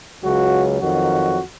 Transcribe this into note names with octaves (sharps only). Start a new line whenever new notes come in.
C#2 C#3 F#3 F#4
F2 D#3 F#3 F#4